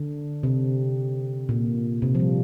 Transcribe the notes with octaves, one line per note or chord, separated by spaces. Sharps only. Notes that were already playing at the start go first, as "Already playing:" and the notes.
Already playing: D3
C3
A#2
C3
F3
G3